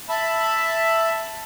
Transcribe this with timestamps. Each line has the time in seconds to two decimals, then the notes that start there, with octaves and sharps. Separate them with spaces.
0.09 E5 A5 B5